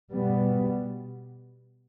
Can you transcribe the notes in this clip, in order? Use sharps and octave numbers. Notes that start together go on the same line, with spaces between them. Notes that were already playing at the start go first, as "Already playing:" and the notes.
B2 G3 B3